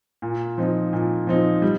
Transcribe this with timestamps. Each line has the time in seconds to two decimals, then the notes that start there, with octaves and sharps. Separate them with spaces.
0.22 A#2
0.58 F3 C4 D#4
0.93 A#2
1.27 F3 C4 D#4
1.62 G3